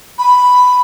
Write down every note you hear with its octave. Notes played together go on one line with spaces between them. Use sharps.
B5